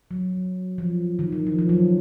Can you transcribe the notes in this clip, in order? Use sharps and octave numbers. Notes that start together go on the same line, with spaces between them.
F#3
F3
D#3
E3
F3
F3
F#3